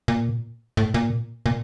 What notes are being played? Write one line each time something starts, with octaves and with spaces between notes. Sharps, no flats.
A#2
A2
A#2
A#2